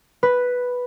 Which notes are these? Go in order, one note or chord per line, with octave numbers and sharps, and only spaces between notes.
B4